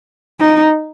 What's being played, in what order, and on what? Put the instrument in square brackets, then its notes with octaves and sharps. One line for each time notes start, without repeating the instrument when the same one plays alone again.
[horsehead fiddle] D#4